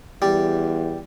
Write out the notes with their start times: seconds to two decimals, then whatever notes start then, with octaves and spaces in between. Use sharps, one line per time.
0.22 E2 G3